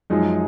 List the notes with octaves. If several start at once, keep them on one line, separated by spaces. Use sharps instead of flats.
F#2 F3 G#3 D#4